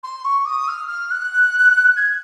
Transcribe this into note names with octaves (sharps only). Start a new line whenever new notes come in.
C6
C#6
D#6
F6
F6
F#6
G#6